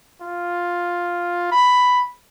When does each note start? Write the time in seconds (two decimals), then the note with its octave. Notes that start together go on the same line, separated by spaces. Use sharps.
0.21 F4
1.52 B5